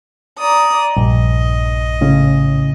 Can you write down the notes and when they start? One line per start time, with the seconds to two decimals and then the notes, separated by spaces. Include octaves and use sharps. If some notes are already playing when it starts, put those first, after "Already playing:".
0.39 D5 A#5 D#6
0.97 A#1 G2 D#5
2.01 A2 C#3 C#4